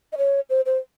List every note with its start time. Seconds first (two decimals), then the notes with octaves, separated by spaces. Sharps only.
0.13 D#5
0.18 C#5
0.50 C5
0.66 C5